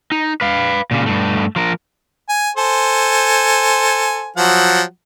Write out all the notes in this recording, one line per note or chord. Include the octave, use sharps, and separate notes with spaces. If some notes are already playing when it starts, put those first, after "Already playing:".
D#4
B4 F5
A#2 C#3
G2 A3
F3 A#4
G#5
A4 C5 G#5
F3 F#3 F#5